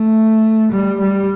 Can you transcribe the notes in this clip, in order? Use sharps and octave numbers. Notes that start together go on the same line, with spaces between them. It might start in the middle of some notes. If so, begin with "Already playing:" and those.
Already playing: A3
G3
G3